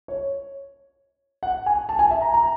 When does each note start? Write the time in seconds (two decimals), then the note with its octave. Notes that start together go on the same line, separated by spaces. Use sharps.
0.08 C#5
1.43 F#5
1.66 G#5
1.89 A5
1.99 G#5
2.11 E5
2.22 A#5
2.34 A#5